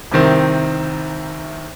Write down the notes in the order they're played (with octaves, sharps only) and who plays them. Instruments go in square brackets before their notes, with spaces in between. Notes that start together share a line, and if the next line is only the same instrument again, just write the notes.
[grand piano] C2 C3 D#3 C4